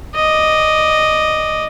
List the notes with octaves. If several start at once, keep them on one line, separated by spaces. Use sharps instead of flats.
D5 D#5